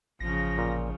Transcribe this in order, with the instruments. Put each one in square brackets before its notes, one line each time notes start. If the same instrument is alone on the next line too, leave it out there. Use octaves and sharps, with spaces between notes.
[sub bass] A1 [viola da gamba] C#3 F3 [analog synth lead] A#6
[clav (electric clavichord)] A#2